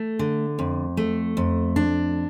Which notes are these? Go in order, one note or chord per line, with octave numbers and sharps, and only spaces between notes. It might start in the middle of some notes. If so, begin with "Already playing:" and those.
Already playing: A3
D3
F2
A3
F2
D4